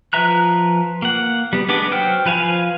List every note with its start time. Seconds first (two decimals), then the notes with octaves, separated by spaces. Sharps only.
0.13 F3 B4 E5 A#5 F#6
1.02 A#3 F#5
1.53 G3 B3
1.69 G#3 B3 D4 B4 D6
1.91 F#3 C5 F#5 G5 F6
2.25 F3 B4 F5 G#5